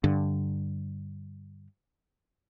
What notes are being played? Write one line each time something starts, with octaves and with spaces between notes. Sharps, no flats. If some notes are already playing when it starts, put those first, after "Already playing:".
G2 D3